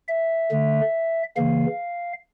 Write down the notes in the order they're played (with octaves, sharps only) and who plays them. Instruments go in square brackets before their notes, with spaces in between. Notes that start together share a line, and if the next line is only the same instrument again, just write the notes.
[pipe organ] E5
D3 A3
C#3 E3 A#3 F5